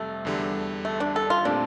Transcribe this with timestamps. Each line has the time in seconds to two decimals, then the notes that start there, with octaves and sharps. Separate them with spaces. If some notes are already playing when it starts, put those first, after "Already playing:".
Already playing: F2 C3 G3 A3
0.25 E2 D3 G3
0.85 A3
1.00 D4
1.16 A4
1.30 F4
1.45 A#2 A3 C4 D4 G4